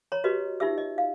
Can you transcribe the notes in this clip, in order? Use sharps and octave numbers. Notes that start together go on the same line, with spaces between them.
C#5 A#5 C6
F#4 G4 B4 D#5
D#4 F4 G4 E5 E6
D#5
F5